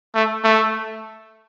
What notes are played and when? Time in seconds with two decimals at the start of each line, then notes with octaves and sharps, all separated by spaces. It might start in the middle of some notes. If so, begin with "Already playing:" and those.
0.15 A3
0.44 A3